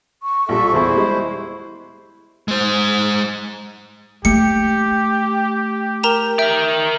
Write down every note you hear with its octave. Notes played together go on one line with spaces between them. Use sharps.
C#6
A#1 G3 A4 E5
E2 E3 E4 G#4 C5
G3 G#3
G#3 C5
A3 G4 C#7
A#4 A#5 E7
A#4 E5 G5